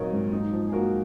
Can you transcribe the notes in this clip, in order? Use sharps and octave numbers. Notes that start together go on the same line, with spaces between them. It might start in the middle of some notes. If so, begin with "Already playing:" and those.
Already playing: A#2 D#3 F#3 C4 A#4 C#5 D#5
G#2
D#4
F3
G#4
A#3 F#4 A#4